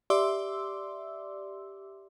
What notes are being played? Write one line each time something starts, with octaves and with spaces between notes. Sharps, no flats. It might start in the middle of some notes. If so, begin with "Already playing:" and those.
G4 D5 E5 C6 D6 E6